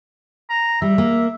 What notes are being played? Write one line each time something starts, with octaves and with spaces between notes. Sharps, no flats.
A#5
G3 E5
A#3